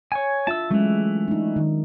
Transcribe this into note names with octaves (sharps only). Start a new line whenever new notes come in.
C#5 G#5
D4 F4 E5 A5 E6
E3 F#3 G#3 A3 C#4
D4 D#4
D#3